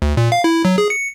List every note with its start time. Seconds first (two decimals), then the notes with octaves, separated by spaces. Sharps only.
0.02 D2
0.17 A#2
0.32 F5
0.44 E4
0.65 F#3
0.78 G#4
0.90 C#7